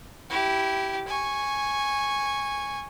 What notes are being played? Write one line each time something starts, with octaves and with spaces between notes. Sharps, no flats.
E4 G4
G#5 C#6